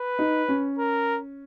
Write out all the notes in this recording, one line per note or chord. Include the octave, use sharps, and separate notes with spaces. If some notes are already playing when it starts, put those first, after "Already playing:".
Already playing: B4
D#4
C#4
A#4